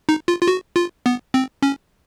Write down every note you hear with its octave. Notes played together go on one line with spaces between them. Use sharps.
D#4
F4
F4
F#4
F4
B3
C4
C#4